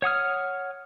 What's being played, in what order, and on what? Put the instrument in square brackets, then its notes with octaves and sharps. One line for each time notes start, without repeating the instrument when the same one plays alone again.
[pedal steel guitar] C#5 F#5 D#6 F6